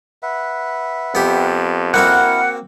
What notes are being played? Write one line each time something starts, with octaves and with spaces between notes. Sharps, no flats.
B4 E5 F#5
F2 B3 G4
A#3 C4 E4 F#4 A#4 F#5